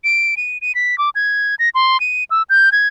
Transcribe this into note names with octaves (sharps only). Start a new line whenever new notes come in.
D7
D#7
D#7
B6
D6
G#6
A#6
C6
D#7
E6
G6
G#6